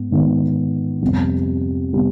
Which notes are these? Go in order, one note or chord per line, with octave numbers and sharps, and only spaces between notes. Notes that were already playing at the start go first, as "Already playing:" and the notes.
Already playing: G#2 B3
G#2 D#3 B3
F2 C3 G3 B3
C3 G3 B3